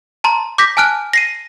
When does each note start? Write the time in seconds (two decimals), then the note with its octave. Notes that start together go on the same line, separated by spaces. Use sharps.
0.24 A5 A#5 C6
0.58 D6 G6 A#6 B6
0.77 G#5 A5 F6 F#6 D7
1.13 A#6 C7 D#7